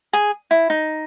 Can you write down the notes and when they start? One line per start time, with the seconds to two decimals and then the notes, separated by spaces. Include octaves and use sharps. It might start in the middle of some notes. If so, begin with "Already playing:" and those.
0.13 G#4
0.51 E4
0.70 D#4